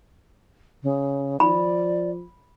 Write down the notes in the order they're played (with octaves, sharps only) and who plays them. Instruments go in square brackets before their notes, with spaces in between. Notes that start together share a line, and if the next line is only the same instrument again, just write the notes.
[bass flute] C#3
[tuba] F3 [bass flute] D5 [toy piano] B5